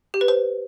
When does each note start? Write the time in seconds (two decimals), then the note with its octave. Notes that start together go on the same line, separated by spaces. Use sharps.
0.14 G4
0.21 B4
0.28 C5